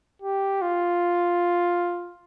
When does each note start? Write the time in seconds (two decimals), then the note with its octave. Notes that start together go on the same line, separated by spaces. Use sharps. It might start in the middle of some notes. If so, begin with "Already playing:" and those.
0.22 G4
0.62 F4